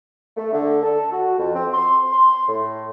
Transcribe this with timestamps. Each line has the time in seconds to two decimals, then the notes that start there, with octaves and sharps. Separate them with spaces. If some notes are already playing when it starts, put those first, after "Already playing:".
0.37 A3
0.53 D3
0.83 A4
1.12 F#4
1.38 F2
1.55 C4
1.73 C6
2.12 C6
2.48 A2